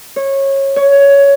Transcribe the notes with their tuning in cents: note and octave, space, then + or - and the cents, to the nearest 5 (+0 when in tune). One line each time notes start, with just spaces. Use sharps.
C#5 -20
C#5 +15